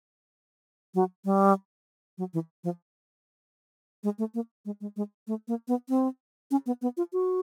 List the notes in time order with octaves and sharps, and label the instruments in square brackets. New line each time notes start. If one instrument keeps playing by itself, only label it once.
[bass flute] F#3
G3
F#3
E3
F3
G#3
A3
A#3
G#3
G#3
G#3
A3
A#3
B3
C4
C#4
B3
B3
F4
F#4